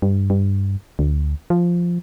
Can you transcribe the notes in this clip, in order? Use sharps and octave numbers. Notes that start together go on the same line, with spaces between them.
G2
G2
D2
F3